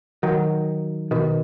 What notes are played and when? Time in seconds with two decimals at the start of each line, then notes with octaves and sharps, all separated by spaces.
0.23 D#3 F#3
1.11 B2 D#3